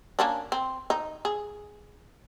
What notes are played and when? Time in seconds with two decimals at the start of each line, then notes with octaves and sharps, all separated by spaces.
0.19 A#3 C#4 D4
0.52 C4
0.90 D#4
1.25 G#4